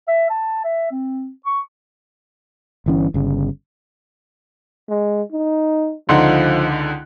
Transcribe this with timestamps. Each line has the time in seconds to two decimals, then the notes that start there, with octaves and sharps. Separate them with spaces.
0.08 E5
0.30 A5
0.64 E5
0.91 C4
1.45 C#6
2.86 G1 E3 C#4
3.14 G1 C#3
4.89 G#3
5.32 D#4
6.09 C#2 D3 F3 D#4 F#5 C6 F#6